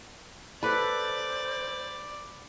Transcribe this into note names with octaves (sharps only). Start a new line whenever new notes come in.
A4 B4 C5 D5 B5